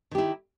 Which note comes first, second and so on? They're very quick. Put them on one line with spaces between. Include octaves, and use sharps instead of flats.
D#3 G4 E4